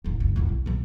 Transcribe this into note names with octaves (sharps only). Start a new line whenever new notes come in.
E1 A1
F#1 C#2
D#1 E4
B1
B1 A#2